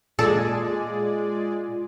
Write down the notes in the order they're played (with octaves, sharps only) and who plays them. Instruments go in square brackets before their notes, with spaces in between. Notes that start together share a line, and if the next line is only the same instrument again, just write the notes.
[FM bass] A#2 [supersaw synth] G#3 G#4 D5 [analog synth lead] F4 [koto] A4